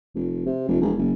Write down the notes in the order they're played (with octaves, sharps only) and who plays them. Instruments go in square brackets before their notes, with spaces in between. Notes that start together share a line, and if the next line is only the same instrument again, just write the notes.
[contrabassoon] F1
C3
F1
E1
F#1